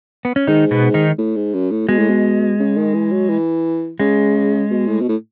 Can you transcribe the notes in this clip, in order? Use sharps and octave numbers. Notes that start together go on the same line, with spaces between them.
B3
C#4
G#2 D#3 D#4
B2 B3
D#3 D#4
A2
G#2
F#2
A2
B2 G#3
A2
B2
C#3
D#3
E3
F#3
E3
C#3 G#3
B2
A2
B2
A2